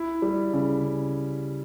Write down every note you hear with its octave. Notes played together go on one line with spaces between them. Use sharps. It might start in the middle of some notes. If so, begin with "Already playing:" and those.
Already playing: E4
G3
C#3